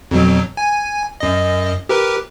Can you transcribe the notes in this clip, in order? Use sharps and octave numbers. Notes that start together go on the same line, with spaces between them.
F2 B2 F#3
G#5
F#2 D#5
G4 A#4 B4